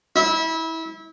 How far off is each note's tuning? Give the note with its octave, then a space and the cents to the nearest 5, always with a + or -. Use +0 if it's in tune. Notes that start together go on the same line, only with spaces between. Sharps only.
E4 -25